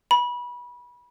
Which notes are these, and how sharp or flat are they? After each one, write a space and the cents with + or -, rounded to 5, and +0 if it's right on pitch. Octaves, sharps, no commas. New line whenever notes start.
B5 -25